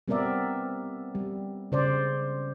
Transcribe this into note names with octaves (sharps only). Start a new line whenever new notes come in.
G3 B3 C4 A#4 D5 E5
G3
C#3 C5 D5